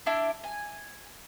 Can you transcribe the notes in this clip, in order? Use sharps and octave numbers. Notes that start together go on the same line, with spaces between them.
D4 E4
G#5